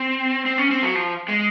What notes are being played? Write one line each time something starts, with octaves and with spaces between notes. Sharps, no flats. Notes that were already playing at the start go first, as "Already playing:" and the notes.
Already playing: C4
C4
C#4
C4
F#3
F3
G#3